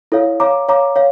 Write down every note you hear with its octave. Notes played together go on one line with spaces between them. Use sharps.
E4 A4 C#5 F5
C#5 F5 A#5 D6
C#5 F5 A#5 D6
C#5 F5